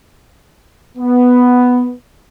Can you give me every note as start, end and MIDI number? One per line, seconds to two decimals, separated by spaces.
0.97 1.95 59